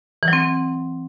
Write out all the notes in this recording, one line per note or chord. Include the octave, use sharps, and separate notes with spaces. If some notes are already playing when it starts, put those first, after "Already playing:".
E3
F#3
C4